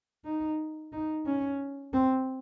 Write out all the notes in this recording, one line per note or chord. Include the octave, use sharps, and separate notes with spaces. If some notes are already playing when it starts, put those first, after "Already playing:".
D#4
D#4
C#4
C4